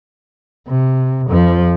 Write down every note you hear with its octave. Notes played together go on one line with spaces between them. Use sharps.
C3
F2 F3